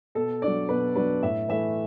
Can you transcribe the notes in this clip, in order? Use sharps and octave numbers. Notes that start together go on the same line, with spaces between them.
B2 A4
F#3 D4 D5
B2 B4
F#3 D4 B4
A2 E5
E3 A3 E5